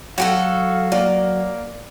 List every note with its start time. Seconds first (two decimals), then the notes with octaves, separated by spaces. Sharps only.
0.18 F#3 F#4 G4 A4 F5
0.92 A#3 D5